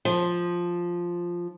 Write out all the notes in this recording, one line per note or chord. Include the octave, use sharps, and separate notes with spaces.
F3